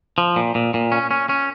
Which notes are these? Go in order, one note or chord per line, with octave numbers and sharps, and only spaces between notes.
F3
A#2
A#2
A#2
C#4
C#4
C#4